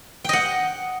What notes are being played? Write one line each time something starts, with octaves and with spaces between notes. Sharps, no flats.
D#5 F#5 G5